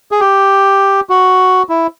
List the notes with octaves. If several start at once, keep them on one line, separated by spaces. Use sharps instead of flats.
G#4
G4
F#4
E4